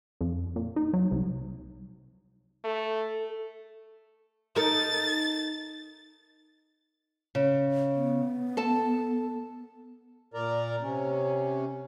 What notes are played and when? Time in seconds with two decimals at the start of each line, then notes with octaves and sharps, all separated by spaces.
0.21 F2
0.56 A#2
0.76 D#4
0.93 F#3
1.11 C2
2.64 A3 A4
4.56 D#4 A4 A#4 A6
7.35 C#3
7.95 B3
8.57 A4 A5
10.34 A#2 A#4 D5 A#5
10.82 C3 C#4